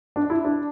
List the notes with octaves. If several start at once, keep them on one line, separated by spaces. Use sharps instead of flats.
D4
E4
D4